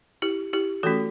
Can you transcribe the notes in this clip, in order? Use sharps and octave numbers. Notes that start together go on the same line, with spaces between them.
E4 G4
E4 G4
E3 A3 C#4 F#4 A4